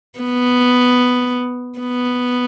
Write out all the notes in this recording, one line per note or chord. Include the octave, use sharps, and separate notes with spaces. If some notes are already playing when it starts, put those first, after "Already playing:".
B3
B3